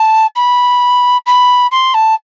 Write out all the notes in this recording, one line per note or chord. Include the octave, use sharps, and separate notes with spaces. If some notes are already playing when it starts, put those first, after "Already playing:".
Already playing: A5
B5
B5
C6
A5